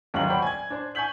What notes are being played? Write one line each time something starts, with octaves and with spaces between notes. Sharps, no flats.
G1 D#2 G#2 F#3 C#6 F#7
C5 D5 F#5 G5 B5 C#6
G#5 G#6
D4 C5
G#5 C#6 G6 B6 F#7